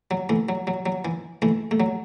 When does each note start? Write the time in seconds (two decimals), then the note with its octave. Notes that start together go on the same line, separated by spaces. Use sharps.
0.11 F#3
0.29 E3 A3
0.49 F#3
0.67 F#3
0.86 F#3
1.05 E3
1.42 E3 A3
1.71 A3
1.80 F#3